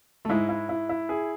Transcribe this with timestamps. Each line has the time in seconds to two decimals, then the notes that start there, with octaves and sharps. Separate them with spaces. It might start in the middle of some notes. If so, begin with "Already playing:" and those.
0.25 A3
0.29 G#2 G#3 E4
0.49 E4
0.69 E4
0.89 E4
1.09 G#4